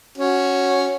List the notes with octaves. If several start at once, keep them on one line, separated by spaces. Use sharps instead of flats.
C#4 F#4